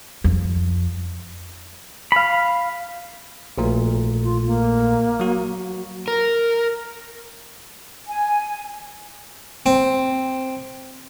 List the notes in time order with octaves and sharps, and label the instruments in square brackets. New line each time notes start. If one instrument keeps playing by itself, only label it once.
[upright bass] F2
[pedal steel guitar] F5 B5
[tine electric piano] A#1 A#2 A3
[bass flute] F4
A#3
[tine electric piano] F#3 F#4
[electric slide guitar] A#4
[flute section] G#5
[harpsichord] C4